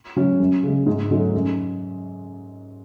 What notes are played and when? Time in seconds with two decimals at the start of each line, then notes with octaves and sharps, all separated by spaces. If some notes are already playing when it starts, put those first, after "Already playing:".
0.16 F#3 C#4
0.40 F#2
0.63 C#3 G#3
0.86 G#2
1.11 F#3 A3 D#4
1.34 F#2